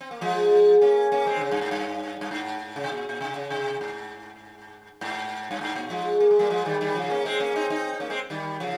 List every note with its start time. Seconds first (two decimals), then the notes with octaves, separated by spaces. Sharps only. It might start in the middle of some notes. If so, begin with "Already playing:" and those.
0.01 C4
0.11 A#3
0.21 F3 G#3
0.81 A#3 C#4
1.12 A#3 C#4
1.26 G#3 C4
1.36 D#3
1.41 C#3
1.51 G2
1.61 G#2
1.71 G2
2.21 G2
2.31 G#2
2.76 C#3
2.84 C3
2.92 A#2
3.09 A#2
3.21 C3
3.35 C#3
3.50 C3
3.81 G#2
5.01 G#2
5.51 G2
5.61 G#2
5.75 A#2
5.90 F3 G#3
6.20 A#3
6.31 G#3
6.39 G3 A#3
6.50 F3 G#3
6.65 D#3 G3
6.81 D#3 G3
6.95 C#3 F3
7.10 A#3 C#4
7.25 G#3 C4
7.40 A#3 C#4
7.56 C4 D#4
7.70 C4 D#4
7.93 C4
8.00 A#3 C#4
8.10 G#3 C4
8.30 D#3 G3
8.60 C#3 F3